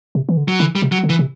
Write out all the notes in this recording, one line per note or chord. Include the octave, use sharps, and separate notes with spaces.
C3
E3
D3
F#3
D3 E3
G3
C3
F#3
D3
E3
C3